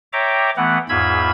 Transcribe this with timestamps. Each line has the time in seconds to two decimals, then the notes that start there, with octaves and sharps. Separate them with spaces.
0.13 C#5 E5 G5 A#5 D6
0.57 E3 A3 B3 F#5
0.89 E2 G#2 F4 B5 E6 G#6